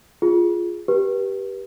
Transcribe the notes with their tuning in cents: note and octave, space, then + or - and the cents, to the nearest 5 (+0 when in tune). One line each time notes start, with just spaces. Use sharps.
F4 +0 G#4 +0
G4 +0 B4 -35